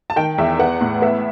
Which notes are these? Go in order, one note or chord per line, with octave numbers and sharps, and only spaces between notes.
A5
D#3 G5
E2 E5
B3 F#5
A2
B3 E5